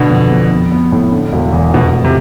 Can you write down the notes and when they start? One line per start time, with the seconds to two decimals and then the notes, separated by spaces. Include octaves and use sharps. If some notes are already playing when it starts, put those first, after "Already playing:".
Already playing: B2 D3 A3
0.10 F2
0.31 F2
0.51 B3
0.72 B3
0.92 A2
1.12 D3
1.33 E1
1.53 E2
1.74 F1 B2
1.93 F1
2.05 C3